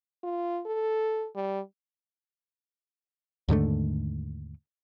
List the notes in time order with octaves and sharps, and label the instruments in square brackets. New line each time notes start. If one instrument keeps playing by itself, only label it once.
[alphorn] F4
A4
G3
[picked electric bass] D#2 G#2 D3 A3